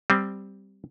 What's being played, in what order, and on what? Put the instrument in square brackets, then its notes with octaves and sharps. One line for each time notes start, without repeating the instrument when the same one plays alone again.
[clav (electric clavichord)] G3 C4